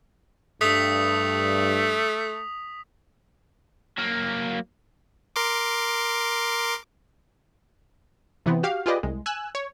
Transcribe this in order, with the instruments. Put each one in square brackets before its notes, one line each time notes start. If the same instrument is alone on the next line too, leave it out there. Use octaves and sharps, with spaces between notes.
[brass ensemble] G2 [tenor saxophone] A3 [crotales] D#6 B6 F7
[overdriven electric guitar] F#3 A#3
[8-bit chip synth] A#4 C6 D6
[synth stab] C3 E3 B3 C4
F#4 G4 F5
F4 G4 G#4 B4 D5 D#5
C2 G#3
G#5 E6 F#6
C#5